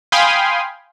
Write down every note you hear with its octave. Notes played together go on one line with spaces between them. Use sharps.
F5 G5 G#5 B5 C6 D#6